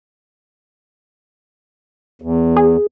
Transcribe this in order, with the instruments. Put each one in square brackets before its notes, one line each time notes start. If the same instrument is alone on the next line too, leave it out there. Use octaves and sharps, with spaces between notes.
[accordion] E2
[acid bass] G#4